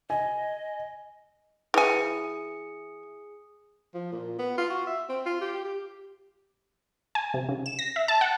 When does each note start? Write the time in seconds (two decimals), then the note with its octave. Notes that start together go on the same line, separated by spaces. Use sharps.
0.10 D#5 G#5
1.74 E3 G#4 G#5 C#7
3.94 F3
4.12 A#2
4.39 B3
4.58 F4
4.70 F#4
4.87 E5
5.09 C4
5.26 F4
5.41 G4
5.65 G4
7.15 G#5
7.34 C3
7.49 C#3
7.66 E7
7.79 A#6
7.96 E5
8.08 A5
8.21 F#5